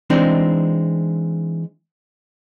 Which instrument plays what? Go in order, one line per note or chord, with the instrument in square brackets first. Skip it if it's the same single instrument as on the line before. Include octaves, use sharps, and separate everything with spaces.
[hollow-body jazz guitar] E3 G#3 C4 D4 D#4